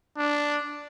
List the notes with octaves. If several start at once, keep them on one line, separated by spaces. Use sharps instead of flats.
D4